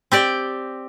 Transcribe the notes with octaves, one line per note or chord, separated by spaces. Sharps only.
C4 G4 D5 G5